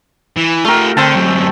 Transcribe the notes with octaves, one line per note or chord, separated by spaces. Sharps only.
E3
A3 F4 G4 A#4
D3 C4 G5 A5
F#2 D3